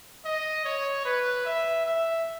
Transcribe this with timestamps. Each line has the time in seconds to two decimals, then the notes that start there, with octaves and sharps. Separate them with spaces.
0.25 D#5
0.65 C#5
1.05 B4
1.46 E5
1.86 E5